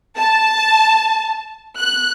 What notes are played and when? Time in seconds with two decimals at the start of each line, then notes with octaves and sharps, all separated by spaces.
0.17 A5
1.78 F#6